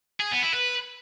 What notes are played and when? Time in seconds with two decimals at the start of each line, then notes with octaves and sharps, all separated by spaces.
0.20 G#4
0.31 B3
0.42 E4
0.53 B4